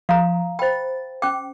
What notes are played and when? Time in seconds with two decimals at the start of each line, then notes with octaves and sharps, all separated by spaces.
0.09 F3 F5 A#5
0.59 C5 G5 B5 A6
1.22 C#4 G5 D6